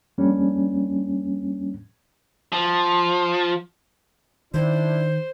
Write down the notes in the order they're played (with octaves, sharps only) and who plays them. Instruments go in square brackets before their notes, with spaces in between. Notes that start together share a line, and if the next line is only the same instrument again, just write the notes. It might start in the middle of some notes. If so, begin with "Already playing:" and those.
[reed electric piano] F2 G3 A#3 C#4 D4
[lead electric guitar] F3
[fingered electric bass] D#3 [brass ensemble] D4 E4 [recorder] C5